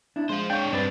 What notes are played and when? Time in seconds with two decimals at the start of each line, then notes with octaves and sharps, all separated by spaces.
0.16 D4 E4
0.29 G#3 F4 C5
0.50 D4 C#5 G5
0.73 G2 C4 D4 B4 D5